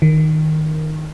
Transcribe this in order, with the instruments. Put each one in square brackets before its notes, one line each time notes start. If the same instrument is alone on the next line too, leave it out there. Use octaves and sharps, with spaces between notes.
[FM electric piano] D#3